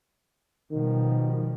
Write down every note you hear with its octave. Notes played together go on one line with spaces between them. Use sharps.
B2 D#3 F3 G3